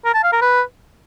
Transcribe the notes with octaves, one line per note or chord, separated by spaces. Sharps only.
A#4
A5
F5
A#4
B4